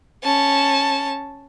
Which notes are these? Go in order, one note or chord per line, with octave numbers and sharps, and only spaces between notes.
C#4 A5